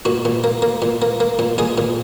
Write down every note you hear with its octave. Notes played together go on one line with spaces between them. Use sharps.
A#2 F#4
A#2
A#3
A#3
A#2
A#3
A#3
A#2
A#2 G#4
A#2